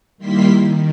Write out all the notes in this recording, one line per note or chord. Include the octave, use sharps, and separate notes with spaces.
D#3 G3 A#3 E4 C6 B6
D#3